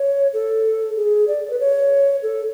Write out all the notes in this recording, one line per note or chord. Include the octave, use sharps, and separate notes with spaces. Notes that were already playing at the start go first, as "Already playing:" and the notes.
Already playing: C#5
A4
G#4
D5
B4
C#5
A4